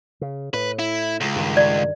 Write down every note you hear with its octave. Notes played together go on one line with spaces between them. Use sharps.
C#3
A2 B4
E4
C#2
G2 D#3
D5